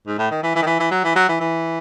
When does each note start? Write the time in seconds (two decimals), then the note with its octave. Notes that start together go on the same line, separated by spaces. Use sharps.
0.07 G#2
0.19 A2
0.31 D#3
0.43 E3
0.55 E3
0.62 D#3
0.67 E3
0.80 E3
0.91 F#3
1.04 E3
1.16 F#3
1.29 E3
1.41 E3